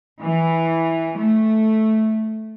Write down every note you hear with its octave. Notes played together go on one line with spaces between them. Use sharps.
E3
A3